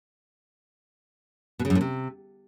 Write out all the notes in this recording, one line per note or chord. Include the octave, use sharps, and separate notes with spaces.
B2
C#3
F#2
A2
C3